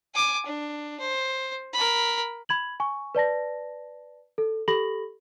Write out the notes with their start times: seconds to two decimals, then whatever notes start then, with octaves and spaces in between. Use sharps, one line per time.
0.15 G#5 D6
0.46 D4
1.00 C5
1.73 A#4 B5
2.49 B5 G#6 F#7
2.80 G#5 C#6
3.15 B4 D5 A5 A#6
4.38 A4
4.68 G4 A4 B5 A#6 F#7